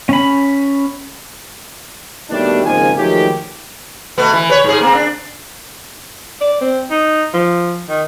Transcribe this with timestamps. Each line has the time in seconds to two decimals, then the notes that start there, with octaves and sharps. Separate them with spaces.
0.09 C#4 B5
2.30 D#2 B2 G3 A3 D4
2.64 G#1 C#3 F3 A#3 D#4 G#5
2.96 D#3 F3 F#3 G#3 A3 G4
4.18 B2 A3 B3
4.33 E3
4.50 B4 C#5
4.64 G#2 G#4
4.81 A#3 C4
4.95 D4
6.41 D5
6.61 C4
6.91 D#4
7.34 F3
7.89 D#3